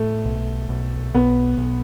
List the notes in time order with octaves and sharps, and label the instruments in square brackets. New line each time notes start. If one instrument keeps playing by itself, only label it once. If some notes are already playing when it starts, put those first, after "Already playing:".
Already playing: [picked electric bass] A2 [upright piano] A3
[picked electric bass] B1
B1
[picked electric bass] B1 [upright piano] B3
[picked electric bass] B1